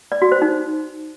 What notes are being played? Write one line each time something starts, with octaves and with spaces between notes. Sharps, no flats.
D5
F#4
C5
D#4